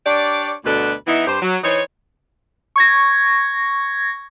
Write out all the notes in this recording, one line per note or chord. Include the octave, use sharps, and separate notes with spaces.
D4 G4 C#5 D5
D2 B2 D4 A4 B4
E3 B3 D#4 E4
G2 G4 C5
F#3
E3 D#4 C5 C#5
C#6 G#6 A#6